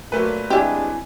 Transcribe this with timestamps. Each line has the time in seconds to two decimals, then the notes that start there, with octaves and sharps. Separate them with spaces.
0.12 A#2 F#3 A3 B4
0.50 E3 G#3 C4 D4 E4 G4 E5 G#5